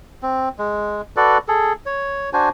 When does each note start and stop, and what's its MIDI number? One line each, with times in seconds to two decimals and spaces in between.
0.23 0.49 60
0.59 1.01 56
1.16 1.38 66
1.16 1.38 69
1.16 1.38 71
1.16 1.38 74
1.48 1.73 68
1.48 1.73 69
1.86 2.30 73
2.33 2.49 62
2.33 2.49 66
2.33 2.49 72
2.33 2.49 80